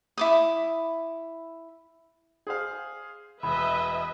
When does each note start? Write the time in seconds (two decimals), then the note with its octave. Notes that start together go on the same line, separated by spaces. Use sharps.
0.17 E4 D6 D#6
2.47 G#4 C5 F5
3.43 E1 B4 D#5 E5 B5